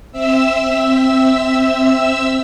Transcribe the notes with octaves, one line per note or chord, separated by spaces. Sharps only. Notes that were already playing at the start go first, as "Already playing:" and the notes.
C4 E5 E6